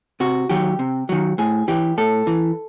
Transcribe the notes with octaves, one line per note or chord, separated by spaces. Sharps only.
C3 F#4
D#3 F#3 G4
C3
D#3 F#3
A2 G#4
E3 G4
A2 A4
E3